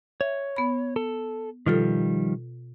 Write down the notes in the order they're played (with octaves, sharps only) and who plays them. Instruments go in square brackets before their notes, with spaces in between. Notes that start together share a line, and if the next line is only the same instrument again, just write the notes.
[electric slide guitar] C#5 [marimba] E5
[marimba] B3 B5
[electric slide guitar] A4
[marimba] B2 F4 A4 [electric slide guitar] D#3 F3 G3